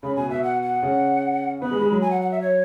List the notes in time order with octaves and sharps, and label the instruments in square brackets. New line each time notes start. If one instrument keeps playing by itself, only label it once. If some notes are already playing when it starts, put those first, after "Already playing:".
[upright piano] C#3 [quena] B5
[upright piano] B2 [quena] G#5
[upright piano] B2 [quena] E5
[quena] F#5
F#5
[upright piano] C#3
[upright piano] B3 [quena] B5
[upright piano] G#3
G#3
F#3
[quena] G#5
F#5
F#5
E5
C#5